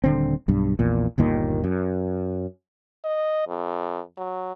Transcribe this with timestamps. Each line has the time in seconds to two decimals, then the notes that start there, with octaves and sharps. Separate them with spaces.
0.04 D#1 D3 C4
0.48 B1 G2
0.79 A#1 E2 A#2
1.18 G1 D#2 A#2 D#3
1.64 F#2
3.04 D#5
3.47 F2
4.17 F#3